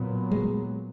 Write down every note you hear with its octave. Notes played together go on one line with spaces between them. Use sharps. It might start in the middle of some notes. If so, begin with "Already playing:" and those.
Already playing: A#2 F#3 B3
G#3